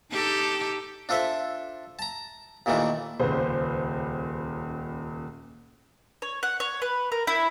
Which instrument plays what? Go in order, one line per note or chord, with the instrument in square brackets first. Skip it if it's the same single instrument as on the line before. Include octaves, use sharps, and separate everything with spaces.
[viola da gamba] D#4 G4 A4
[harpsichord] D4 F4 A4 C5 E5
A5 A#5
D#2 A#2 D#3 E3 A3
[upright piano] D#1 C#2 [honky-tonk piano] B4 C5
[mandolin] C#5
F#5
C#5
B4
A#4
E4